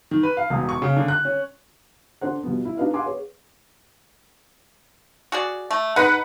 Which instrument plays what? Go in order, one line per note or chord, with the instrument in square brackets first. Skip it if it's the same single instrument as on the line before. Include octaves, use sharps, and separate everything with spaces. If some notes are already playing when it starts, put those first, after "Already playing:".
[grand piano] D#3
B4
F5
E1
C#6
C#3
D3
F#6
C#4
[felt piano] D4 A4 C5 F#5
B2 F3 G3 B3
E4
D4 D#4 B4 D#5 F5
F5 F#5 G#5 C6 D6
G#4 B4 C#5
[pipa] F#4 G#4 D5
A3
[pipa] D#4 [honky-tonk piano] B4 F#5